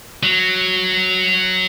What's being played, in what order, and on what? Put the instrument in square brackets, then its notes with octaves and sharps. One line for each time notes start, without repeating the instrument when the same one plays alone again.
[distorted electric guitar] F#3